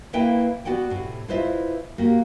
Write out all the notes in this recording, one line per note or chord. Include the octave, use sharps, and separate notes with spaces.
A#3 E4 B4 E5 G5
B3 F#4 D5 F#5 G5
A2 C3
E4 F4 B4 C5 D#5 E5
A#3 F#4 G4